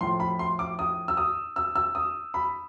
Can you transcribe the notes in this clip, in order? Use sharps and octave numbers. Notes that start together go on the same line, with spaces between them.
A2 F3 C6
B5
C6
D6
D#6
E6
D#6
E6
E6
D#6
B5